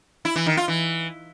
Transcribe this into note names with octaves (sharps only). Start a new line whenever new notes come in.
E4
E3
D#3
F4
E3